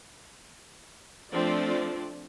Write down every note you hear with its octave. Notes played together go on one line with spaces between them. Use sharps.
F3 A3 C4 D4 F4 D5